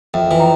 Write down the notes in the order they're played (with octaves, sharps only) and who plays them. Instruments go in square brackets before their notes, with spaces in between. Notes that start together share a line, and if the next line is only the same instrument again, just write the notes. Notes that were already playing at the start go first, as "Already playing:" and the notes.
[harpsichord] F2 [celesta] E5 G5
[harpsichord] E3
[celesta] G5 A#5